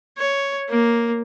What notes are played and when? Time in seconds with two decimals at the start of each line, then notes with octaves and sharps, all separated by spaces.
0.17 C#5
0.69 A#3